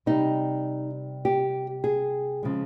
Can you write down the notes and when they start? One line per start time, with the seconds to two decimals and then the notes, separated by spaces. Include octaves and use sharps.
0.06 C3 G3 D#4
1.25 G4
1.84 G#4
2.43 C#3 F3 G#3